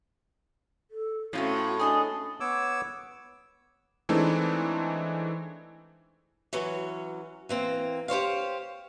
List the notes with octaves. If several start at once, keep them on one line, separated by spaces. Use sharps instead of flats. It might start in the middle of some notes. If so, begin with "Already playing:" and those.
A4
A2 A3 C4 C#4 D#4 F4 F#4
D4 G#4 D#5 A5
B3 C#5 D6 E6
E3 G#3 A3 C4 D4 D#4
E3 F#3 C#4
E3 A#3 C4
G4 C5 C#5 F5